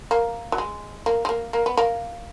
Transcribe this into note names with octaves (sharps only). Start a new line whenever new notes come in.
A#3
F#3
G#3
A#3
G#3
A#3
A#3
B3
A#3